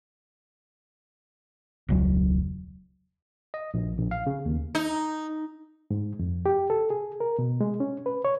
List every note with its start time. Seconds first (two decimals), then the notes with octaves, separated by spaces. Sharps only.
1.88 E1 C#2 F#3
3.54 D#5
3.74 A#1
3.97 A#1
4.11 F5
4.27 C#3
4.45 D#2
4.75 D#4
5.91 G#2
6.19 F2
6.46 G4
6.70 A4
6.90 G#4
7.20 A#4
7.39 B2
7.61 G#3
7.80 C#4
8.06 B4
8.25 C#5